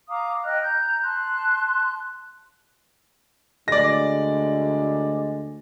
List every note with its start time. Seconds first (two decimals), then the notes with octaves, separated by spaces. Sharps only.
0.09 F5 A#5 D6 D#6
0.44 D#5 G5 F6 F#6
0.61 A#5 G6
1.02 A5 C6 F#6
3.68 D2 G#3 D5 A#6